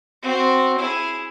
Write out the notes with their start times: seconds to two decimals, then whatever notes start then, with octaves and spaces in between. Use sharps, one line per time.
0.22 C4 F#4
0.79 E4 G#4